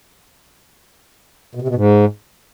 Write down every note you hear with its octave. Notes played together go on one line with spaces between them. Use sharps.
B2
C3
B2
G#2